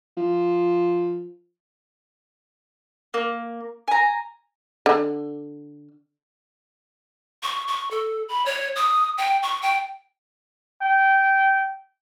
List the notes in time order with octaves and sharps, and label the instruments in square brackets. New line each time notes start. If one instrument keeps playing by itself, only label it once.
[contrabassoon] F3
[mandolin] A#3
G#5 A#5
[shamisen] D3
[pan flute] C#6
C#6
A4
B5
C#5
D#6
G5
C#6
G5
[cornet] G5